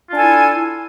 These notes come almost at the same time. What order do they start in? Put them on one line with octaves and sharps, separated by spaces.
F4 D4 G#5 A4 E4